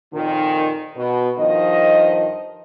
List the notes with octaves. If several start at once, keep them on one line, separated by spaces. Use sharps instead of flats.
F2 A#2 D#3
B2
G2 D#3 F3 D#5